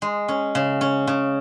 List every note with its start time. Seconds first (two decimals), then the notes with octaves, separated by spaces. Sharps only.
0.02 G#3
0.28 C#4
0.55 C#3
0.81 C#4
1.07 C#3